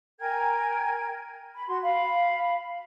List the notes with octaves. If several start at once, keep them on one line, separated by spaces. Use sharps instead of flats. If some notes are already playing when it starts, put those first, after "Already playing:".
A#4 G5 G#5 G#6
B5
F#4 C6
F5 B5